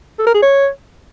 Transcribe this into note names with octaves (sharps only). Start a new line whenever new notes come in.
A4
A#4
G#4
C#5